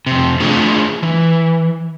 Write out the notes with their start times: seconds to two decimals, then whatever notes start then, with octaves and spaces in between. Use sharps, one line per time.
0.06 F2 C3
0.40 A3 D4 F4 G#4
1.03 E3